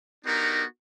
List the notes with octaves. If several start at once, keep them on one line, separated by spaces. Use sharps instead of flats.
B3 D4 D#4 F#4 G4 A#4